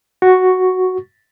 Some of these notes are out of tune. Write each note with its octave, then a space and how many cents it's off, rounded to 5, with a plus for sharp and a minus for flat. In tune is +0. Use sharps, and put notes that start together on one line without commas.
F#4 +0 C#6 +0